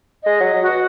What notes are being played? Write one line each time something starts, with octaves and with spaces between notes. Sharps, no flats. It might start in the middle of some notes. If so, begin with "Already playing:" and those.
G#3 D#5
F#3
D#5
F#3
B2 F#4